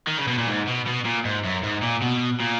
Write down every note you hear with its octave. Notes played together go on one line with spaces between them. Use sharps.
D#3
C#3
B2
A#2
G#2
B2
B2
A#2
G#2
F#2
G#2
A#2
B2
A#2